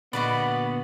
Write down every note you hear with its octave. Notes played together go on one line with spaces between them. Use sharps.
A#2 D3 B3 F#4 B4 D5 D#5 B5